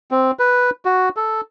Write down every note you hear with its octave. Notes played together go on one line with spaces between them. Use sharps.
C4
B4
F#4
A4